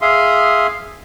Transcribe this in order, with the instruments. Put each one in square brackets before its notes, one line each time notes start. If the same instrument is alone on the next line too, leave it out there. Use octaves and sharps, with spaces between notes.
[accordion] G#4 E5 F5 C6 D#6